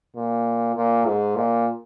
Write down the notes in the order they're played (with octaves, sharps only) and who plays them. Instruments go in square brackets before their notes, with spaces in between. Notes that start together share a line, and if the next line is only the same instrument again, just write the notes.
[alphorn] A#2
A#2
G#2
A#2